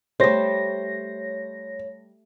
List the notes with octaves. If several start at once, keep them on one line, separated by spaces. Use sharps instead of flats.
G3 A3 C5 C#5 A#6